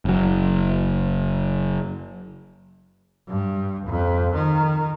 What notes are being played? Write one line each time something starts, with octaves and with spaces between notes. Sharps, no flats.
F#1 F#3
G2
F2
D#3